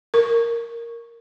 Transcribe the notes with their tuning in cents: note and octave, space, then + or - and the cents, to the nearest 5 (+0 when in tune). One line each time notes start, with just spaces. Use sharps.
A#4 +0 C#6 +0